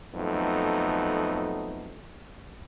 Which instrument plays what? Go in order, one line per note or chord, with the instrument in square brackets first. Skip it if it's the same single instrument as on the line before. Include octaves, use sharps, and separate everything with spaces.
[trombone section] F2 F#3 A3 B3 D#4